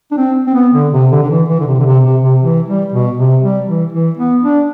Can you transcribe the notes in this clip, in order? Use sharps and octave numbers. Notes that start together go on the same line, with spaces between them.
D4
C4
C4
B3
D3
C3
D3
D3
E3
E3
D3
C3
D3
C3
C3
C3
E3
G3
B2
C3
G3
E3
E3
B3
D4